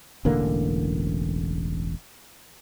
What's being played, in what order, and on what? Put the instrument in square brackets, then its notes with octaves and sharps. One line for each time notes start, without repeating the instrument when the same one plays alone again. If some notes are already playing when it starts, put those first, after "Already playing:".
[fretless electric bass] E1 A1 D3 A#3